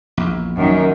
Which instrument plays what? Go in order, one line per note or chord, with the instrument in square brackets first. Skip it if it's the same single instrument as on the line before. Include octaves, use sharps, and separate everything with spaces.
[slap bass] A#1 E2
[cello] F#2 D#3